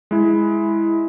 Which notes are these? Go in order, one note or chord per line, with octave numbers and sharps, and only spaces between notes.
G#3 E4